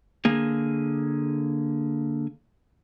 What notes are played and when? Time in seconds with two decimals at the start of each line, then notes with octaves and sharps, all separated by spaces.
0.25 D3 A#3 G#4